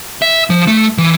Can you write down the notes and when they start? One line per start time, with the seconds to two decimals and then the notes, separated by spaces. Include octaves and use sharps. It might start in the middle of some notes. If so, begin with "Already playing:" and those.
0.22 E5
0.50 F3
0.67 A3
0.98 E3